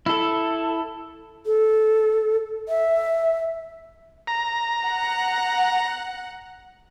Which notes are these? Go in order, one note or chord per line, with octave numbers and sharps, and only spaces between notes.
E4 A4
A4
E5
A#5
F#5